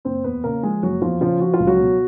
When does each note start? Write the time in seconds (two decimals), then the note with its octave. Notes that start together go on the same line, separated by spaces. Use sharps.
0.05 F#1 C4 C5
0.24 E2 B3 B4
0.44 C#3 A#3 A#4
0.63 F3 G#3 G#4
0.82 F#1 F#3 F#4
1.02 E2 F3 F4
1.21 C#3 F3 F4
1.40 F3 F#4
1.54 F4
1.60 C#2
1.67 F#3 F#4
1.80 B2